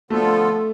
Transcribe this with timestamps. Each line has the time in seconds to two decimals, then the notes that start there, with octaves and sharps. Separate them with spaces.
0.10 D3 F3 A3 B3 F4 A4